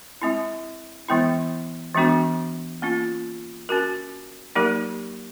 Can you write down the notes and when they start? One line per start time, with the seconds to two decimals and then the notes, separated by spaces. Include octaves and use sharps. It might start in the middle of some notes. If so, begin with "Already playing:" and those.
0.22 G#3 C4 E4
1.08 E3 G#3 B3 E4
1.95 E3 G#3 B3 D4 F#4
2.82 A#3 C#4 F4
3.69 C#4 F#4 A#4
4.56 F#3 A#3 D#4 G4 A#4